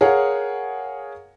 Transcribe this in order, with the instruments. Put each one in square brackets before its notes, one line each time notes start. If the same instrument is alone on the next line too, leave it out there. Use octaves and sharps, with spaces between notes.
[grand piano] G#4 A#4 C#5 F5 F#5